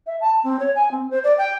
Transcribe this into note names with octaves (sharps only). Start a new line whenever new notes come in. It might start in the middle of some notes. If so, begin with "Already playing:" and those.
E5
A5
C4
C#5
G#5
C4
C5
D5
G5